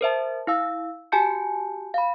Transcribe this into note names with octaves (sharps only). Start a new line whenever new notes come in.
A#4 C5 E5 A5
E4 F5 E6
F#4 G4 G#5 A5 G6 C#7
F5 B5